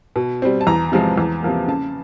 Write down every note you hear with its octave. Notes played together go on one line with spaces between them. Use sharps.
B2
G3 C4
A5
E2 A#5
C3 F3 G#3
E2
C3 F3 A#3
C#3 A5